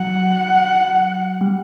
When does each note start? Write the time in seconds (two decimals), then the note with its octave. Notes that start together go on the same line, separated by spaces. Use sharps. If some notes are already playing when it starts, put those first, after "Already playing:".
Already playing: F#3 F#5
1.41 G3